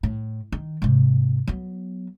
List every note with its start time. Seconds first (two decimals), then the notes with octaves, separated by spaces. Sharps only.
0.03 A2
0.52 D#3
0.82 G#2 C3
1.47 F#3 B3